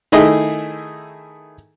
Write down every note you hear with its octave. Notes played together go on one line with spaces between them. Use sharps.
D#3 A3 E4 G#4 D#5 D#6